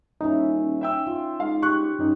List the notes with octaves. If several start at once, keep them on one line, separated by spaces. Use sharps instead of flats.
D#1 C#4 D#4 E4
E5 G5 E6
F4
G#2 F5
G4 C#6 F#6
G2 D#3 C#4 D#4